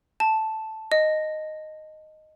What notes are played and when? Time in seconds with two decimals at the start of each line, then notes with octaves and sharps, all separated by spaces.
0.20 A5
0.92 D#5